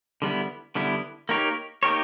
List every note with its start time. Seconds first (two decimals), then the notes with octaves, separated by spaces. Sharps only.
0.22 D3 G3 B3 E4
0.75 D3 G3 B3 E4
1.29 A#3 D#4 G4 A#4 C#5
1.83 A#3 D#4 G4 A#4 C#5